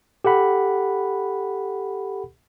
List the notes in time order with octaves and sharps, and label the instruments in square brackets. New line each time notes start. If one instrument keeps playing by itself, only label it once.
[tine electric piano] G4 A4 F#5 B5